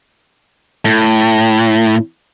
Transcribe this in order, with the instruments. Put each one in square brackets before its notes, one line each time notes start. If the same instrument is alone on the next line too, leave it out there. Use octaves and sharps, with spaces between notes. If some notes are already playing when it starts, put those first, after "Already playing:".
[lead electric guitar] A2